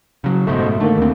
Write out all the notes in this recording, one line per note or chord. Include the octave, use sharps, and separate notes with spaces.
C#3 F#3
F#1 G#2 B2 A3 C5 D#5
D3 D#3 A3 A#3
D#2 C4